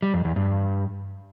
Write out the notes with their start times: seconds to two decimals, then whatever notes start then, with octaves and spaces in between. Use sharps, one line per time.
0.02 G3
0.14 F2
0.25 E2
0.36 G2